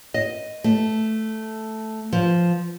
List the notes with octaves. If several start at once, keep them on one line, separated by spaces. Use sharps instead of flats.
D#5
A3
F3